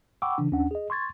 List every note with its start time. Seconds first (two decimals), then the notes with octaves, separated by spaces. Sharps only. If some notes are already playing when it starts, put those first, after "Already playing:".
0.22 F#5 G5 B5 C#6 D6 E6
0.38 C#3 E3 D4
0.52 D#2 C#4 D4 F#5
0.71 G#4 D#5
0.90 C6 C#6 G#6 A6